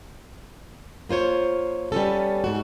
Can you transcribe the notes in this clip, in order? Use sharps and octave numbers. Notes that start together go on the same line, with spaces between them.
A#3 F4 C5 C#5
G3 B3 C#4 A4
G#2 F#4